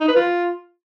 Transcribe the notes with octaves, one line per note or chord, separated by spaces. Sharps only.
D#4
B4
F4